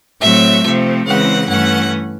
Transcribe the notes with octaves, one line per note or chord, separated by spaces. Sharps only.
A2 F#3 A3 C4 E5
C3 F3 A3 C4
C#3 E3 G#3 C4 F#5
G2 E3 A3 C#4 F#5